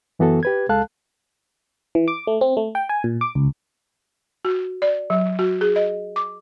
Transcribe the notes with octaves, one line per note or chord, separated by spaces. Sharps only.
F#2 E3 B3 F#4 A4
G4 B4 G#6
C#2 G#3 A4 F5 A5 F#6
E3
D6
A3
C4
A3
G5
G#5
A#2
D6
C#2
F#4
D5
F#3
F#4
G#4
D#5
D6